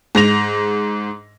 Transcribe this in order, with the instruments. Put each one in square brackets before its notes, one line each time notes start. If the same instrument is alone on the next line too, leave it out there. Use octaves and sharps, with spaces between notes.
[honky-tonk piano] G#2 A#6 F7